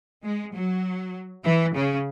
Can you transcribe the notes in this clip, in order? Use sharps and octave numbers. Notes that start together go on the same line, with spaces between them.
G#3
F#3
E3
C#3